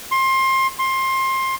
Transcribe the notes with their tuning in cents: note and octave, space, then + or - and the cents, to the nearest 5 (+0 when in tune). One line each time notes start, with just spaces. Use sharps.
C6 +25
C6 +20